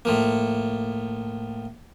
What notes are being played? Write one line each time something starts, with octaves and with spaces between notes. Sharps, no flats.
A2 F3 A#3